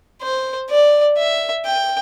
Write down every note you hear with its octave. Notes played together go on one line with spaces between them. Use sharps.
C5
D5
E5
G5